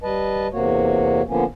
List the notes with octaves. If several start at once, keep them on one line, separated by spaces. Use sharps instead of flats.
G3 B4 D#5 A5
E2 C3 A#3 F#4 C#5
D3 F3 A#3 B3 C#4